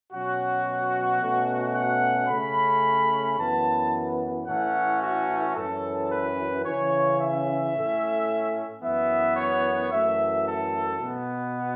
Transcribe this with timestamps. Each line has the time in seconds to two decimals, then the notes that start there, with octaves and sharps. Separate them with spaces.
0.12 B2 F#3 C#4 F#4
1.21 B2 A3 C#4
1.75 F#5
2.29 C#3 A3 C#4 B5
3.38 F#2 E3 B3 A5
4.47 A2 E3 A3 C#4 F#5
5.01 F#4
5.56 F#2 E3 C#4 A4
6.11 B4
6.65 C#3 E3 C#4 C#5
7.19 E5
7.73 A2 A3 C#4
8.82 F#2 E3 B3 E5
9.37 C#5
9.91 F#2 E3 A3 E5
10.45 A4
11.00 B2 B3